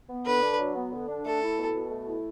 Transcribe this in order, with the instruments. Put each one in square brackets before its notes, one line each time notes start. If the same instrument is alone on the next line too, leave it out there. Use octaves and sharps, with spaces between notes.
[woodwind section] B3
[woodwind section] D3 [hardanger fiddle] B4
[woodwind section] D4
F#3
B3
D3
D4
[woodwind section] A3 [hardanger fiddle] A4
[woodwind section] E4
B2
B2
A3
E4